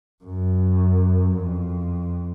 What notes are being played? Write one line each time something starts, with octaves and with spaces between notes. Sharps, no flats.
F#2
F2